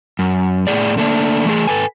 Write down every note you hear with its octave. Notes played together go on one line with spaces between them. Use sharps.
F#2
A2 G#4 D5
D3 A3 A#3 D4
E3 A3 G#4
A4 B4 G#5